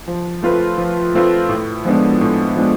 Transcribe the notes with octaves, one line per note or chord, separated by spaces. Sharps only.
F3
A3 C4 F4 B4
F3
A3 C4 F4 B4
A2
F3 G#3 B3 D4
A2
F3 G#3 B3 D4